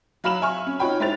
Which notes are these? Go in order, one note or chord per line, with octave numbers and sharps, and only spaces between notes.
F#3 F5 B5 F6 E7 F#7
E5 G#5 C#6 F6
C#4
D#4 F4 F#4 C#5 G5 B5
G#2 E4 C5 A6 F7